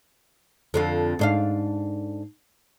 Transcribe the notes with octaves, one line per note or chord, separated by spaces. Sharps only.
F2 D3 F4
G#2 D4 F5